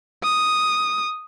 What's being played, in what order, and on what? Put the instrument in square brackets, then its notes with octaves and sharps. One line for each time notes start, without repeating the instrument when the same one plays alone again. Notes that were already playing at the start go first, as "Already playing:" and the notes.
[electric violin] D#6